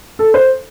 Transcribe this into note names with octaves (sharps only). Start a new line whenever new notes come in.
A4
C5